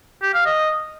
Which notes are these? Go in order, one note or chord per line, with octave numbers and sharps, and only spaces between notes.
G4
F5
D#5